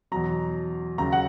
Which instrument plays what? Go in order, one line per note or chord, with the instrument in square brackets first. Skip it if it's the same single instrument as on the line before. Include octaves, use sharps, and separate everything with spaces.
[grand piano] E2 B2 F#3 A#5
D#2 C#3 F#3 A#5
F#5